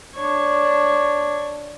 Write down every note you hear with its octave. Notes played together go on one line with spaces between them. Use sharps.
D4 C#5